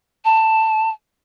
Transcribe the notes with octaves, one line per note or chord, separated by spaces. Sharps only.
A5